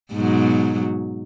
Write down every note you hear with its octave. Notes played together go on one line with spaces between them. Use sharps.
G#2 B2 F#3